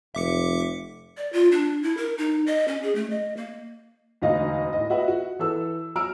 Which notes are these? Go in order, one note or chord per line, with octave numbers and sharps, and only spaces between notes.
F1 E5 D6 C#7
D5
F4
D4
E4
A#4
D#4
D#5
C#4
G#4
A3
D#5
A#3
E1 D2 D#4 D#5 F5
A2 D#5
F#4 B4 D#5 E5 F#5
F#4
E3 A4 E6
F#3 A#5 E6 F6 D7